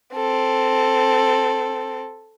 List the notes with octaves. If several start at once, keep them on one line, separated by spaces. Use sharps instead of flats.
C4 A4